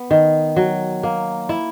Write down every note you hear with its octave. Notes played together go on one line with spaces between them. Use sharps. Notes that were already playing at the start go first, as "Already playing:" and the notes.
Already playing: B3
D#3
F#3
A#3
E4